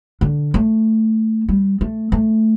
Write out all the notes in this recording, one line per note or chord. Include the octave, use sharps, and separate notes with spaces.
D3
A3
G3
A3
A3